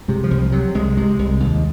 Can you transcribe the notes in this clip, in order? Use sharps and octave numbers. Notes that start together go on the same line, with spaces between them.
C3 G#3
F3
C2
F3
C3 F#3
C2 G#3
C3 G#3
C2
D#2